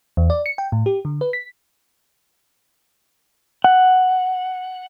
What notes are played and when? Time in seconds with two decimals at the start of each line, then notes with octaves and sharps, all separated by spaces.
0.17 E2
0.30 D5
0.46 C#7
0.58 G5
0.72 A2
0.86 G4
1.05 D3
1.21 B4
1.33 B6
3.64 F#5